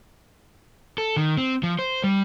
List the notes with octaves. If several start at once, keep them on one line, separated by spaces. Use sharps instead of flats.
A4
D#3
C4
F3
C5
G3